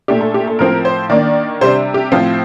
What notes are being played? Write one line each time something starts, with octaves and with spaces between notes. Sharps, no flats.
A#2 A3 D4 G4
A4
G4
A4
A2 F3 C4 A#4
C5
D#3 A#3 D4 D5
C3 G3 D4 C5
G4
A2 F3 C4 F4